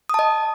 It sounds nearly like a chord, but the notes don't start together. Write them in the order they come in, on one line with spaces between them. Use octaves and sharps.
D#6 A5 D#5